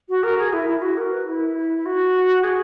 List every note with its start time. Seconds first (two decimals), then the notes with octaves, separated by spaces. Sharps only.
0.09 F#4
0.23 A#4
0.38 G#4
0.53 E4
0.67 E4
0.82 F#4
0.97 A#4
1.11 B4
1.26 E4
1.86 F#4
2.43 G#4